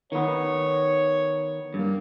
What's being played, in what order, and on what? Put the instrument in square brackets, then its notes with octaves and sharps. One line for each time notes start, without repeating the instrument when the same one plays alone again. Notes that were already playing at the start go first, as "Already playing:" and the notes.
[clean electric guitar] D#3 B3 [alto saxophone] C#5
[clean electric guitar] G2 [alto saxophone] A#3